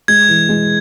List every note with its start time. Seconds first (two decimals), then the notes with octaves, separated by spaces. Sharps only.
0.08 G#3 G#6
0.28 E3
0.49 G#3